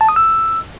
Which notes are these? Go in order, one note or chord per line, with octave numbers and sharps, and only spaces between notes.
A5
D#6
E6